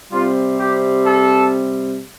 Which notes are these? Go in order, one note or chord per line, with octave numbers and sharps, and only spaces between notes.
C3 G3 C4 F4
G4
A4